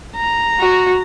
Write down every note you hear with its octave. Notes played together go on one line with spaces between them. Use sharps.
A#5
F#4